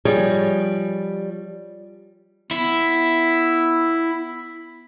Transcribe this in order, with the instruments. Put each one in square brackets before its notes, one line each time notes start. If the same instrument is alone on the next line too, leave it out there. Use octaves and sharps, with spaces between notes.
[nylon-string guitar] F3 G3 G#4 C#5 D#5
[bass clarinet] B3 [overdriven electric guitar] E4